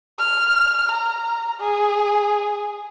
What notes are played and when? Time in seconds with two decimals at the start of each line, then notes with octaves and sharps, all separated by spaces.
0.19 F6
0.91 A#5
1.60 G#4